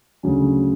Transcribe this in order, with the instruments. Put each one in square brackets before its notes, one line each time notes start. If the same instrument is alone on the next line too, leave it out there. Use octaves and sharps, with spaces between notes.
[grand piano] D2 C#3 F#3 C#4